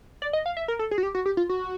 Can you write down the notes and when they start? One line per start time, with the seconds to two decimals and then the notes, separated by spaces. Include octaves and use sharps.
0.22 D5
0.33 D#5
0.46 F5
0.57 E5
0.68 A#4
0.79 A4
0.91 G#4
0.98 F#4
1.03 G4
1.15 F#4
1.26 G4
1.37 F4
1.49 F#4